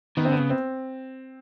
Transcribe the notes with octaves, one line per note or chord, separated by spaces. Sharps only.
D#3 B3
C4
D3 B3
C#3
C4